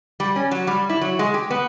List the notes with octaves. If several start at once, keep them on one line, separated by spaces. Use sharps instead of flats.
G3
C#4
F#3
G3
E4
F#3
G#3
G4
B3